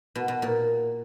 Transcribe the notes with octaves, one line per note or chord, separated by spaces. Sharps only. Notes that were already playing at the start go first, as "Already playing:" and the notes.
B2
B2
A#2